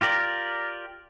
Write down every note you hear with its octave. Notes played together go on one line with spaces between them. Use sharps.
F4 G4 A#4 D5